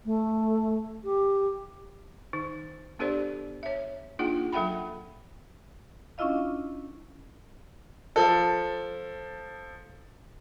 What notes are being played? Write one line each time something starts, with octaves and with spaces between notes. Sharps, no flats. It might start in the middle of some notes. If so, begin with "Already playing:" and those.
A3
G4
D#3 D#4
B3 D4 G4 A4 C5 D5
C#5 E5
A#3 D4 D#4 F4 G#4 F#5
F#3 A4 E5 F#5 G5 B5
C#4 D4 E4 F4 D#5 F5
F3 A4